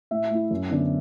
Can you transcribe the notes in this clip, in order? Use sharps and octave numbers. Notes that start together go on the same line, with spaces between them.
A2 E5
A3 E4
F#2
D3 B3 D4